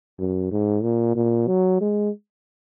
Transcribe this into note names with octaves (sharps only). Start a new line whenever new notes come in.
F#2
G#2
A#2
A#2
F#3
G#3